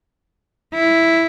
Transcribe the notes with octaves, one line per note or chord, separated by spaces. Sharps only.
E4